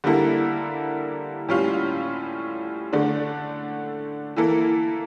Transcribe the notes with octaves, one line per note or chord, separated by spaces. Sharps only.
D3 G3 A#3 E4 A4
A2 G3 C#4 F4
D3 A3 D4
E3 A#3 E4 A4